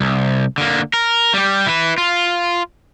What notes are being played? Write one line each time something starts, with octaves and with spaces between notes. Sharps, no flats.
C2
D3 A#3
A#4
G3 G4
E4 B4
F4